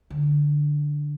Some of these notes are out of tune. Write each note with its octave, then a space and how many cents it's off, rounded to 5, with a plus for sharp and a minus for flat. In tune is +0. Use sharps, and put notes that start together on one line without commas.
D3 +0